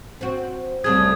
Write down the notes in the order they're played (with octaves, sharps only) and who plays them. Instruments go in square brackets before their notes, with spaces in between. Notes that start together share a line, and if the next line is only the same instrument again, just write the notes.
[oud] C4 F#4
[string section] C2 [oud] C#3 A3 G#4 [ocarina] D#6 [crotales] G#6